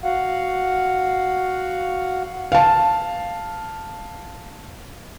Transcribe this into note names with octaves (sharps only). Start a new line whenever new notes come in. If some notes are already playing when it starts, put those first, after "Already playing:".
F#4 F5 F#5
F5 A5